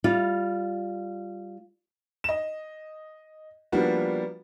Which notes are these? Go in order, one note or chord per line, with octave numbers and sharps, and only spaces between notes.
G3 F4
D#5 E7
F3 G3 A#3 B3 D4 F#4